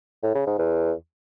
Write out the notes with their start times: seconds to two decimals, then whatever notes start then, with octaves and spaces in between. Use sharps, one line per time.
0.23 A2
0.35 C#3
0.47 G#2
0.59 E2